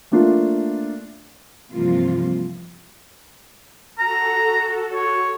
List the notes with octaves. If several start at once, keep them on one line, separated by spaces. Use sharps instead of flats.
A3 A#3 D4 F4
G2 C3 E3 F3 A#3 F4
F#4 A4 A#5
C#5